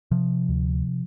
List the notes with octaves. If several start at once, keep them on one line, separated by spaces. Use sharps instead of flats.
C3 F3
D2